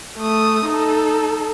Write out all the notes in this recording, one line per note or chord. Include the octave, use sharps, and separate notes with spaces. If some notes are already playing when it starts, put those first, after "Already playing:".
A3 D#6
D#4 A4